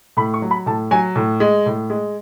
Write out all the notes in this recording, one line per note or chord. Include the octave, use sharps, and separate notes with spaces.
A2 B5
C#6
F#3
B5
A2 A5
F#3 G#5
A2
G#3
A2
G#3